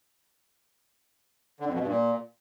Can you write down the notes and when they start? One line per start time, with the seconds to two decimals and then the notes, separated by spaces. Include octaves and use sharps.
1.60 D3
1.67 F2
1.74 B2
1.81 G2
1.88 A#2